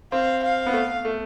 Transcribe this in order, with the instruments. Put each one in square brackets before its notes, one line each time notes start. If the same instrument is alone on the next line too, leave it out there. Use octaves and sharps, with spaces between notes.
[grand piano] C4 [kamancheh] F5
[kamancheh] F5
[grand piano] B3
A3
A3